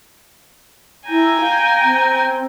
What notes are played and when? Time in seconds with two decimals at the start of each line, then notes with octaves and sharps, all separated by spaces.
1.09 E4 G5 G#5 A#5
1.41 F5
1.84 C4